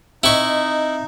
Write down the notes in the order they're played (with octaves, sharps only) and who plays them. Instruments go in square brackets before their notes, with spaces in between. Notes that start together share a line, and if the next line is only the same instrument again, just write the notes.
[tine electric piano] C4 D#5 E5 [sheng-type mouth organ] D#4 [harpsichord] E4 C#6